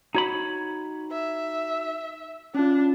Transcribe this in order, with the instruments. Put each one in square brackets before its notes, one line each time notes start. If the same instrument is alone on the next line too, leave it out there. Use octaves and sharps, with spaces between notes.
[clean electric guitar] D#4 C#5 B5 [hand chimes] F#4
[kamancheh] E5
[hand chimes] C#4 F4 [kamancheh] D4